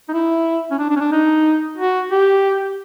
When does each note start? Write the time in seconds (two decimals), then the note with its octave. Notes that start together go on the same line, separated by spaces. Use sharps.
0.09 D#4
0.13 E4
0.71 C#4
0.79 D4
0.90 D4
0.96 C#4
1.00 D4
1.12 D#4
1.78 F#4
2.11 G4